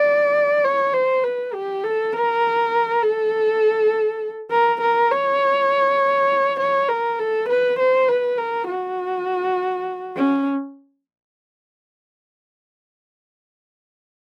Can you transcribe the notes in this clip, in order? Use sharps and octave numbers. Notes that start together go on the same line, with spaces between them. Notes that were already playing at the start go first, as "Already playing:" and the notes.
Already playing: D5
C#5
C5
B4
G4
A4
A#4
A4
A#4
A#4
C#5
C#5
A#4
A4
B4
C5
B4
A#4
F#4
C#4